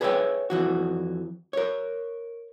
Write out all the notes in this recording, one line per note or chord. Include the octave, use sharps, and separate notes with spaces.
G#4 B4 C#5 D#5 E5 G5
F2 E3 F#4
A#4 C#5